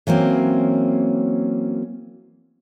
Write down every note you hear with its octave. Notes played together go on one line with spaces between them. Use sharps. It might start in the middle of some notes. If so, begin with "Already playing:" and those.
E3 F#3 A#3 C4 C#4